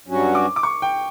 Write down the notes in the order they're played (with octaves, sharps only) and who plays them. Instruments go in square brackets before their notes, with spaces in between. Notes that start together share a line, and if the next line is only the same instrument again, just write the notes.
[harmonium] G2 F#3 C#4 F#4
[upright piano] D6
D6
C#6
G5